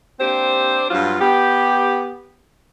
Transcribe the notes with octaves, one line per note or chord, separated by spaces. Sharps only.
A#3 C4 D4 G4 C5
G2 F#3 F4
B3 G4